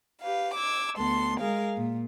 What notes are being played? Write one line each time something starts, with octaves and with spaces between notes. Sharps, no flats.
G4 B4 F5
D6 E6 G#6
D2 B3 A4 C6
G#3 G#4 A#4 F5
A#2